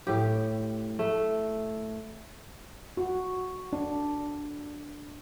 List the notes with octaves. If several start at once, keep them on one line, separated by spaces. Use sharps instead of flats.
A2 G4
A3
F#4
D4